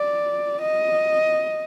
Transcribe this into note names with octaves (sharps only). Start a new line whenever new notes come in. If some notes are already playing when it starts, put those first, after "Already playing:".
Already playing: D5
D#5